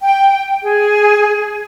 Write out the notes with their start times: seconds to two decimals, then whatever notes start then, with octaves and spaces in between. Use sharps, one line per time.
0.01 G5
0.63 G#4